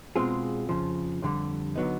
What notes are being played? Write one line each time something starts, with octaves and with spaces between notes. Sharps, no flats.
B2 G#3 C4 F4 G#4
F2 C#3 F3
F2 D3 G3
D3 F#3 B3 D#4